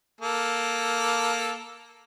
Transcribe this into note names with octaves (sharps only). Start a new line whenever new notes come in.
A#3 A4